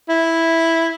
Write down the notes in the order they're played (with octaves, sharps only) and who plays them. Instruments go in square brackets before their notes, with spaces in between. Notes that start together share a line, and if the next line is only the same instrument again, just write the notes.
[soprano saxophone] E4